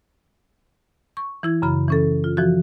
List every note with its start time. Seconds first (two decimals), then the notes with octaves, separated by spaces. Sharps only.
1.17 C#6
1.43 E3 E4 G#6
1.62 F#2 C#3 B5
1.88 E3 C#4 A4
2.24 F4
2.37 E3 F3 F#4